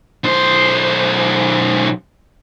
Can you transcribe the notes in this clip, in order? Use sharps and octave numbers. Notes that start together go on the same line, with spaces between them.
B1 C5